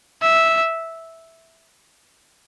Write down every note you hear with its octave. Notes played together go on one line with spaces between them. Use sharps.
E5